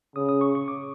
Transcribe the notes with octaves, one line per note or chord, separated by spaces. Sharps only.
C#3 D#6
D#6
C#6
C#6
D6